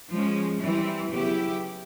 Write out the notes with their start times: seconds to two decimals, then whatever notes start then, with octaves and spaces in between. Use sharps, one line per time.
0.12 F3 G#3 C#4
0.61 E3 G3 C4 E4
1.11 C#3 F#3 B3 E4 G4